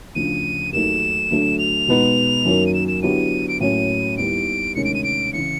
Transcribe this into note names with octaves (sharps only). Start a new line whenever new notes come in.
D2 C#3 F3 D#7
D#2 D#3 F#3 A3 E7
D2 D3 F#3 A3
F7
B2 G#3 B3 D#4
F#2 D#3 F#3 A#3
D#7
E7
E7
D3 F#3 B3 E4 G4 D#7
D7
A2 F#3 A#3 C#4 D#7
D#2 D#3 G3 B3 E4 D7
D2 C3 D#3 G#3 C#4 C#7
D7
D#7
D7
C#3 E3 C#7